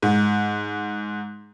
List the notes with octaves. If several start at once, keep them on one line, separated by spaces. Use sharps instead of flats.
G#2